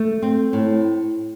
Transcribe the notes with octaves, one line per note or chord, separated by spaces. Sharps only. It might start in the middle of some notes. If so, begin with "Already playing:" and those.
Already playing: A3
C4
A2